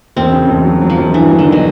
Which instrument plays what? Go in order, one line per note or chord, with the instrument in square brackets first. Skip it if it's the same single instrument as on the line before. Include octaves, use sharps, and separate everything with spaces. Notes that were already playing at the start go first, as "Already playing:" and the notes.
[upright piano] E1 [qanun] C4
[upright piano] C#3
E1
F#3
F#3
[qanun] F3
[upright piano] E1
[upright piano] G2 [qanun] E3
[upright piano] F#3
[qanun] D3
[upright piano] D#3
[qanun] B2